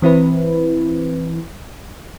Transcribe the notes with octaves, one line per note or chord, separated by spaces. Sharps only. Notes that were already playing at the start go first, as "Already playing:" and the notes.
E3 C4 E4 B4